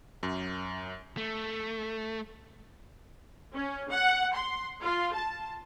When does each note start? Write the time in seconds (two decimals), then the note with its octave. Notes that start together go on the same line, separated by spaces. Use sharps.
0.23 F#2
1.17 A3
3.54 C#4
3.90 F#5
4.34 C6
4.82 F4
5.14 A5